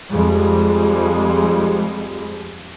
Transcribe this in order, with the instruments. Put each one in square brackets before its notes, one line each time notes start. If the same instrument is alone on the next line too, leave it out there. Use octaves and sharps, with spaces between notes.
[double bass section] F2 G3 G#3